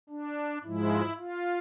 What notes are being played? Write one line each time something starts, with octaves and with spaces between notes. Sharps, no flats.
D4
G#2 F3 G#3 E4
F4